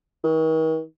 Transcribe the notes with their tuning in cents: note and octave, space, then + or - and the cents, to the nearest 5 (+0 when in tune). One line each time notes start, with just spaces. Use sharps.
D#3 +40